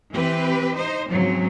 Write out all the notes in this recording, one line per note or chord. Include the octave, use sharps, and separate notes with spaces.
E3 C4 G4 B4
D#4 C5
G#2 C#3 F3 F#3 C4